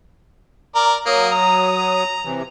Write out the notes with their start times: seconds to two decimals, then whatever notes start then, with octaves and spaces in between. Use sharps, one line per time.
0.75 A#4 D5
1.06 F#3 A#3 D#6
1.32 A#5
2.25 C3 E3